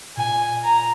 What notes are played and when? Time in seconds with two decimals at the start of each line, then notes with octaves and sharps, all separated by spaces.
0.17 A#2 G#5
0.63 A#5